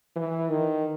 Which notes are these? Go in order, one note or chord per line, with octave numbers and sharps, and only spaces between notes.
E3
D#3